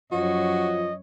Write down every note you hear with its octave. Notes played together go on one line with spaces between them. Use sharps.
F#2 F3 F#4 C#5 D#5